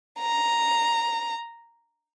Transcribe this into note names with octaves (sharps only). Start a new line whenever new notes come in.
A#5